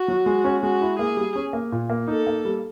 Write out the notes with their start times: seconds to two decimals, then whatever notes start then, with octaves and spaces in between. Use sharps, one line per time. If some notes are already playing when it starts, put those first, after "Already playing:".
Already playing: F#4
0.08 F#3
0.26 G#3
0.44 C#4
0.63 G#3 F#4
0.81 E4
0.99 A#3 G#4
1.17 G3
1.36 C#4
1.53 A#3
1.72 A#2
1.90 A#3
2.08 D#4 A4
2.27 A#3
2.45 G3